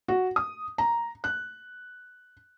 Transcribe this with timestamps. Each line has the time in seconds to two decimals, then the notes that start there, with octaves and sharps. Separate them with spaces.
0.08 F#4
0.36 D#6
0.78 A#5
1.24 F#6